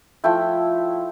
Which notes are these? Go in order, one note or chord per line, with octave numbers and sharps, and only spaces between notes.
F3 A3 E4 G5